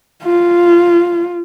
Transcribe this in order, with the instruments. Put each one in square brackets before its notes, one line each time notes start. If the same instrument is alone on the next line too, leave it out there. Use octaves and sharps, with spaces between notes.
[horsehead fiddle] F4